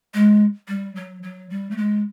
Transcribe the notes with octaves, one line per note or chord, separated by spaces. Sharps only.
G#3
G3
F#3
F#3
G3
A3
G#3